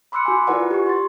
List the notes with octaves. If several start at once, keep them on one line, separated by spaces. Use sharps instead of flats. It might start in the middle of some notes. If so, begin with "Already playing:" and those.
B5 C6 D6 E6 F#6 C#7
F#4 G#5
E4 F4 A#4 B4 D5 F#5
G4 C#6
C6 A6